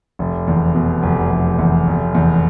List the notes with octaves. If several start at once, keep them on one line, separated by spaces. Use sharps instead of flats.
F1
E2
B2
F1
F1
E2
F1
E2